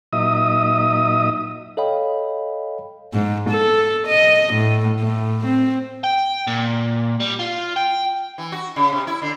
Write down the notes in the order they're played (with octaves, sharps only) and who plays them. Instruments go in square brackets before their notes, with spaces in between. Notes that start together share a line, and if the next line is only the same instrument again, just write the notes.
[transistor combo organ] A#2 F#3 D#4 D#5 E5 D#6
[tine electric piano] A4 C#5 D#5 F5 G5 B5
[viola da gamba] G#2
A4
D#5
A2
A2
C4
[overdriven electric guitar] G5
A#2
G3
F4
G5
[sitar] E3
F#4
C#3
C3
E4
D3